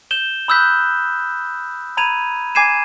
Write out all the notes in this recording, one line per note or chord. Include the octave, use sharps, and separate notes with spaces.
G6 E7 G7
B5 D#6 E6 F#6 G6 B6
A#5 B5 G#6 D#7 F7
G#5 D6 G#6 C7 D#7 E7